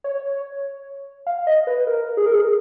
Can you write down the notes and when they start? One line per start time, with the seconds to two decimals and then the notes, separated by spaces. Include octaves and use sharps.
0.04 C#5
1.27 F5
1.47 D#5
1.67 B4
1.87 A#4
2.17 G#4
2.26 A#4
2.34 G#4